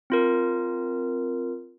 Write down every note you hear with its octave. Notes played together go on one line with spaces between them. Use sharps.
C4 F4 A#4